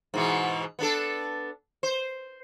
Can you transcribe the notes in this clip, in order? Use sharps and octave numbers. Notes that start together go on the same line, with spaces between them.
G#2 B2 E3
B3 D4 A4
C5